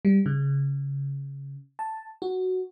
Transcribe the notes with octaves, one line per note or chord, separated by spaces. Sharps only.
G3
C#3
A5
F#4